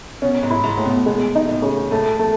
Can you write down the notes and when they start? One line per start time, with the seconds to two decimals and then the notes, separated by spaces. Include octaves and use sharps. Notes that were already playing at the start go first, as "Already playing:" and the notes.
0.22 B2 C#4
0.43 G#2
0.50 E4
0.64 G#2
0.78 A2
0.85 B2
1.06 B2 G#3
1.35 D#4
1.49 A2
1.62 C#3
1.91 A2 A3
2.19 A3